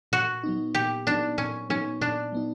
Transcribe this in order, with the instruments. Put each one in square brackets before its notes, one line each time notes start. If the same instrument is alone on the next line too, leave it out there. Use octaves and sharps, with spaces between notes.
[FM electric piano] A#2 [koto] F#4
[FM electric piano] F#3 B3 D#4
[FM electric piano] A#2 [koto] G4
[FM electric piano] F#3 B3 D#4 [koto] D4
[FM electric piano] A#2 [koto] C#4
[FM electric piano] F#3 B3 D#4 [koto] C#4
[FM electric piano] A#2 [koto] D4
[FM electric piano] F#3 B3 D#4